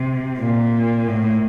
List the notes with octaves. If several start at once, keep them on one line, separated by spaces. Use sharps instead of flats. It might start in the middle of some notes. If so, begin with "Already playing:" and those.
Already playing: C3
A#2
A2